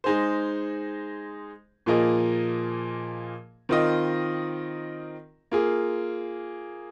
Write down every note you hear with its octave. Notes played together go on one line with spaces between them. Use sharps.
G#3 D#4 G#4 C5
A#2 F3 A#3 G#4 D#5
D#3 C4 F4 A#4 D#5
A#3 F4 G#4